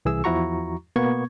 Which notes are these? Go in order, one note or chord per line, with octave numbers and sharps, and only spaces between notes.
C2 E3 G#4 E6
E2 F3 E4 F#4 A#5 C#6
B2 A#3 B3 C#6 G#6